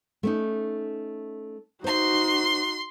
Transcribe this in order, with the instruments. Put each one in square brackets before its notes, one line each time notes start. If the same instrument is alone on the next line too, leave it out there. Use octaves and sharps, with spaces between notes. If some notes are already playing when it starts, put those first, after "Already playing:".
[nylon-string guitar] A3 C#4 D#4
[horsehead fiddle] D#4 F#4 [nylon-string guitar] C5 [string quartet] C6